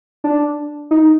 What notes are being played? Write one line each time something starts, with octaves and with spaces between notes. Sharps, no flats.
D4
D#4